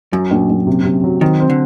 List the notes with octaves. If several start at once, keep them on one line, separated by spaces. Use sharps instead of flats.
F#2 F#3
A#1
A#1
C3
C3
F#3
D#3 C4
C4
D3